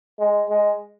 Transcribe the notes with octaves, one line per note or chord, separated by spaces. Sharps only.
G#3
G#3